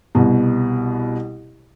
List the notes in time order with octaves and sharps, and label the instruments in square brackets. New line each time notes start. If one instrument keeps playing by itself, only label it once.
[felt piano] C2 B2